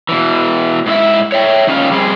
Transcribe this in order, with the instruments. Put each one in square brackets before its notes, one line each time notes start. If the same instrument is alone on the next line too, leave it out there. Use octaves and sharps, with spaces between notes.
[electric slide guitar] B2 E3
G#2 E4 E5
C#5 E5 G5
D#3 C#4 D4 F4
G3 C4 G#4